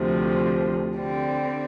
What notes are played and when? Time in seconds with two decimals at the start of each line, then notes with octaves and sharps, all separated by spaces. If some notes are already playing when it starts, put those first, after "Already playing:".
Already playing: D2 C3 F3
0.95 D3 G3 C4